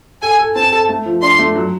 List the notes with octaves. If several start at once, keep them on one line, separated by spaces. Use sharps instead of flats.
A4 G#5
A4
C4 A5
A4
A3
F3
D4 C6
A3
F#3